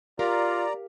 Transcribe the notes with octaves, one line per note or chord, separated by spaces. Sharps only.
F4 G4 A#4 D5 F5 A#5